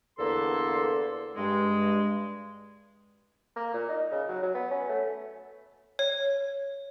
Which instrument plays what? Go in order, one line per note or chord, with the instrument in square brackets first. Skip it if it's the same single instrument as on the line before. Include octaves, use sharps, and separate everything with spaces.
[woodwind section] E2 D3 A#3 A4 B4 C6
G2 G#3
[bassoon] A#3
A#2
D#4
C#3
F#3
F#3
B3
C#4
A3
[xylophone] C#5